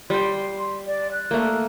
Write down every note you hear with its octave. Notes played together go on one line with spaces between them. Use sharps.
G3 G5 C6
D5
F#6
A3 A#3